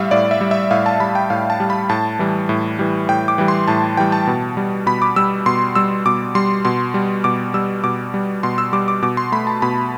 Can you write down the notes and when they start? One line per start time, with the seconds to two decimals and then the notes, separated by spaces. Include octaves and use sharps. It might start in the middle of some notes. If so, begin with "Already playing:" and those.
Already playing: A2 G3 E5 F5
0.11 A2 D5
0.31 E5
0.41 G3
0.51 E5
0.71 A2 F5
0.86 A5
1.00 G3 B5
1.15 G5
1.30 A2 F5
1.50 A5
1.60 G3
1.70 B5
1.89 A2 A5
2.19 E3 G3
2.49 A2
2.79 E3 G3
3.09 A2 G5
3.28 D6
3.38 E3 G3
3.48 C6
3.68 A2 A5
3.97 E3 G3 G5
4.12 A5
4.27 B2
4.57 G3
4.86 B2 B5
5.02 D6
5.16 G3 E6
5.46 B2 C6
5.75 G3 E6
6.06 B2 D6
6.35 G3 C6
6.65 B2 C6
6.94 G3
7.24 B2 D6
7.54 G3 E6
7.84 B2 D6
8.14 G3
8.43 B2 C6
8.58 E6
8.73 G3 D6
8.88 D6
9.02 B2 D6
9.17 C6
9.32 A3 B5
9.47 A5
9.62 B2 B5